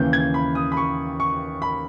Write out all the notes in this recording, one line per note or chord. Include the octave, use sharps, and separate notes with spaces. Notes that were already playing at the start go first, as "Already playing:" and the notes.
Already playing: D#2 C#3 E3 G6
G#6
B5
D#6
B5
C#6
C#6
B5